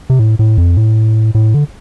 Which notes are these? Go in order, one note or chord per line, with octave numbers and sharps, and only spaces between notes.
C3
A2
A2
F2
A2
A2
D3